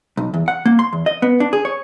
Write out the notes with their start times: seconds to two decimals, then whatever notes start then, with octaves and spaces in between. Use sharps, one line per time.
0.17 B1
0.34 E2
0.48 F#5
0.66 A#3
0.79 C6
0.93 E2
1.06 D#5
1.22 B3
1.40 D4
1.53 G#4
1.65 C#5